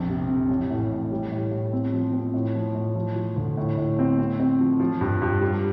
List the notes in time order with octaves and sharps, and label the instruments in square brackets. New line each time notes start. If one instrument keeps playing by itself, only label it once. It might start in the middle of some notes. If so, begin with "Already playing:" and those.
Already playing: [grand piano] A#1 F2
C3
F2
A1
A2
A2
G3
A2
A2
C4
F3
C4
A2
F3
A2
F3
F3
D2
A2
A2
C4
C4
C4
F3
F3
G2
G2
G3